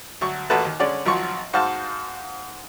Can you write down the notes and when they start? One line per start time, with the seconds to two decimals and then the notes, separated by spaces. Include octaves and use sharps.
0.21 D2 F#3 C#6
0.50 A1 A#2 A3 F#4 B4 A5
0.65 D#2
0.80 D3 G#3 C#4 D5
1.06 G#1 F3 F#3 F4 C#6
1.53 G#2 F#4 C5 F5 A5